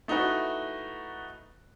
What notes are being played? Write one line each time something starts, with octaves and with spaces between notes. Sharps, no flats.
A3 D#4 E4 F#4 B4